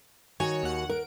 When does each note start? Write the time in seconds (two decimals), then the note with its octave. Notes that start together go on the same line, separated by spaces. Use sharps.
0.40 D#3 F#4 C#5 G#5
0.63 D#2 F#5
0.89 A#4 D7